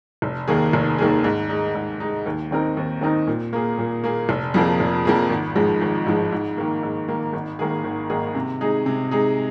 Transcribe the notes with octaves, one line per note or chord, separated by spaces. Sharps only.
F1
D#2 D#3 A#3 G#4
F1
D#2 D#3 A#3 G#4
G#2
G#3 D#4
G#2
G#3 D#4
D#2
D#3 C4 D#4 A#4
D#2
D#3 C4 D#4 A#4
A#2
A#3 G#4
A#2
A#3 G#4
F1
F2 F3 A#3 G#4
F1
F2 F3 A#3 G#4
G#1
G#2 F3 G#3
G#1
G#2 F3 G#3
G#2
D#3 A#3
G#2
D#3 A#3
G#1
G#2 D#3 A#3 G#4
G#1
G#2 D#3 A#3 G#4
C3
G#3 D#4 G#4
C3
G#3 D#4 G#4